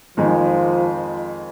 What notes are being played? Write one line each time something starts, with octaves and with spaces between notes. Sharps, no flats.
F2 D#3 F3 G#3 D#4